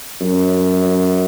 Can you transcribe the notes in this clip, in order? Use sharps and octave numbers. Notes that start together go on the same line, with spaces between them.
F#2